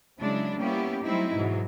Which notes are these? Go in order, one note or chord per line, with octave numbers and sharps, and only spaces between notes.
C#3 F#3 G#3 D4 E4
G3 A#3 B3 C#4 E4 G4
F#3 G3 A3 C4 D#4 E4
G#2 B2 E3 F#3